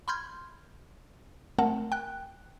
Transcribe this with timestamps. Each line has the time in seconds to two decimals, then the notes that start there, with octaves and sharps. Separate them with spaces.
0.08 B5 C6 F6 G6 G#6
1.58 A3 C4 A#4 F#5 A5
1.92 G5 F#6